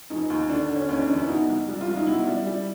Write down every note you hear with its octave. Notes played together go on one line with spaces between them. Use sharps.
F1 D#4
D#2
D3 D4
D3
C#4
D#2 C#4
D4
F1
E4
B2 D#4
C2
G3
F4
C2
D#4
B2 E4
G3
G3